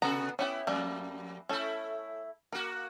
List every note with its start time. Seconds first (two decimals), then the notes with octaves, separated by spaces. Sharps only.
0.02 C3 B3 F#4 A4 A#5
0.39 B3 C#4 E4 G4 G5
0.67 F2 G3 A3 A#3
1.49 A3 C#4 E4 A4
2.52 A#3 F#4 A#4